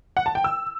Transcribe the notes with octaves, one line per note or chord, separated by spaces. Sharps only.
F#5
A5
G5
E6